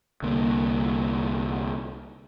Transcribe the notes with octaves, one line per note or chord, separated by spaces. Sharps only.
C2 D3 A#3